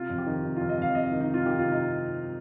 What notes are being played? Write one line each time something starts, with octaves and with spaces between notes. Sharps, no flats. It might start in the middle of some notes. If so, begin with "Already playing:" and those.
Already playing: C3 F4
F2
G4
D#3
C3
F2 F4
D#5
F2 F5
C3 D#5
D#3
D#4
C3 F4
D#3 G4
C3 F4
D#4